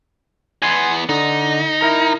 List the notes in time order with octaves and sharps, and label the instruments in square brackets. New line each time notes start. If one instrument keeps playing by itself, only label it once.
[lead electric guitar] E2 B3 [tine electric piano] G#5 C6
[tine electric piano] D3 [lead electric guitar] D#4
[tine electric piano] E4 A#4 A#5